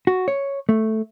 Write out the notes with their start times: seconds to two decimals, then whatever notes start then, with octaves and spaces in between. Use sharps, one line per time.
0.07 F#4
0.28 C#5
0.69 A3